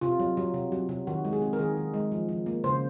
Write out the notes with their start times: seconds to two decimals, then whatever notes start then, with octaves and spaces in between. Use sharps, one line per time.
0.01 C3 F4
0.20 F#3
0.37 F#3
0.54 C3
0.72 F#3
0.89 C3
1.07 D#3 F#4
1.25 G#3
1.33 G#4
1.42 C4
1.53 A#4
1.59 D#3 G#4
1.77 D#3
1.94 G#3
2.12 F3
2.29 F3
2.46 A#3
2.64 C#3 C5